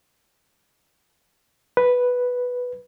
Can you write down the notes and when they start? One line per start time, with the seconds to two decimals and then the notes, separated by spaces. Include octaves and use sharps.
1.77 B4